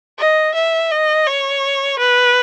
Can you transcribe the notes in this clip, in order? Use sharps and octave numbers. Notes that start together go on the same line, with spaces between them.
D#5
E5
D#5
C#5
B4